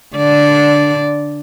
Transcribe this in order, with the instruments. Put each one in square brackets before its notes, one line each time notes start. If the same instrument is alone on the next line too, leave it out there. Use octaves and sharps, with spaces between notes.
[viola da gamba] D3 D5